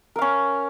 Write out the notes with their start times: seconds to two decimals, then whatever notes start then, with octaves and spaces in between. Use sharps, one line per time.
0.16 A#4
0.19 F5
0.22 C#4